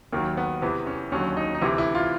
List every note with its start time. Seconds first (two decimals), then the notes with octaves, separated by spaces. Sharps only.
0.12 D#2 D#3 F#3 A#3
0.37 B3
0.62 E2 C3 E3 B3
0.87 C#4
1.12 D#2 D3 F#3 C#4
1.37 D#4
1.55 D#4
1.61 D2 C3 E3 E4
1.78 E4
1.95 F4